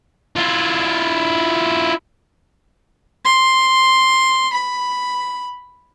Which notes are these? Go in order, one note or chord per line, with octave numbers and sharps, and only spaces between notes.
E4 F4
C6
B5